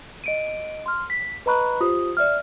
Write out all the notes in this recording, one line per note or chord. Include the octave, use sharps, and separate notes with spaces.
D#5 D7 D#7
C6 F6
B6
B4 D#5 A#5 B5 C#6 F#6
F4 G4 C5 D#6
D5 E5 F6